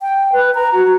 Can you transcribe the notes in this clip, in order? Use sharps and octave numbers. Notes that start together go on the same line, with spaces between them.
G5
B4
A#5
F#4